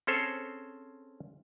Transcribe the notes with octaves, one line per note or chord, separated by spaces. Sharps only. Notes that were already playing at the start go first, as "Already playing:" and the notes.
C4 C#4 G#4 A4 C5 C#5